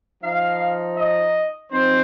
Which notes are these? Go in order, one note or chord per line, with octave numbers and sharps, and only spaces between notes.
F3 D#4 F5
D#5
F3 C4 D#4 C5